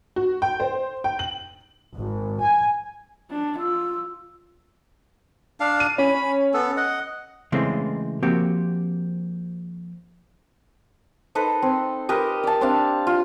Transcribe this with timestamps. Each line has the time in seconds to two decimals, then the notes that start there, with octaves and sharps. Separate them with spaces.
0.16 F#4
0.42 G5
0.60 C5
1.04 G5
1.19 F#7
1.97 G#1
2.41 G#5
3.31 D4
3.59 F4 E6
5.60 D4 F5
5.80 D#7
5.98 C#4 B5
6.54 B3 A4
6.77 D#5 F#5
7.52 C#3 E3 G#3 A3 C4
8.23 F3 A#3 C4 F#4 G4
11.35 D#4 A4 B4 C5
11.62 C4
12.09 G4 A#4 B4 D#5
12.43 D5 A5
12.61 C4 D4 F5
13.07 F4